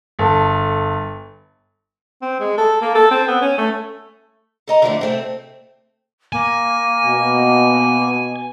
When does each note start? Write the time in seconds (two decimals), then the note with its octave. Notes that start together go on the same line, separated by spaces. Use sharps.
0.19 G1 A4
2.22 C4
2.40 G#3
2.58 A4
2.81 A#3
2.95 A4
3.11 C4
3.28 B3
3.42 C#4
3.57 A3
4.68 A4 D#5 A#5
4.82 D3 E3 F3 G3 A3 D4
5.01 C3 A3 C4
6.32 A#3 G#5
7.04 B2